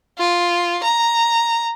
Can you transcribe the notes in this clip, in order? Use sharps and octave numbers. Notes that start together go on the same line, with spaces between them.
F4
A#5